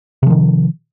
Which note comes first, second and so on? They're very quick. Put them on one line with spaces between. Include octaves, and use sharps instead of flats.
C3 F3 D#3